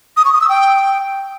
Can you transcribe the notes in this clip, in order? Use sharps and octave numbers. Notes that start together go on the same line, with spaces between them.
D#6
C#6
D#6
E6
G5